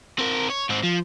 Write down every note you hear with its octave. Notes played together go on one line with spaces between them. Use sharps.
C4 A#4
C#5
G#2 C4
F3